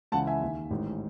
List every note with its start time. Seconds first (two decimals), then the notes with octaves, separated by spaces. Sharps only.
0.12 C#2 C#3 E3 F#5 A5
0.27 E5 G#5
0.41 D#2 D#3
0.70 A1 G#2 D#3